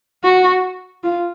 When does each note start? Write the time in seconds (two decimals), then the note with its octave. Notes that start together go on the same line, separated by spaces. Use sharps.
0.24 F#4
1.04 F4